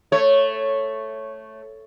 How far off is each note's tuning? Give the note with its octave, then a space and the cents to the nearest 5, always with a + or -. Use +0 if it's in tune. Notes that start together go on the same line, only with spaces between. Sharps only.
A3 +0 C#5 -5